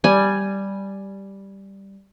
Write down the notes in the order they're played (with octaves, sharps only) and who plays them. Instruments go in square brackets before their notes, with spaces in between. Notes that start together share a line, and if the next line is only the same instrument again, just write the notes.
[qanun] G3 G#5